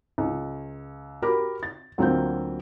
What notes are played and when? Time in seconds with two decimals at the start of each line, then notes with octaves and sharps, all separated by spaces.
0.18 C#2
1.22 F#4 G4 A#4 B5 D6
1.63 A6
1.98 D2 F#3 A#3 C4 F4 G6